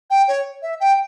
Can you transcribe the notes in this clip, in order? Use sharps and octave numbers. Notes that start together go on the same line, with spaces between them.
G5
C#5
E5
G5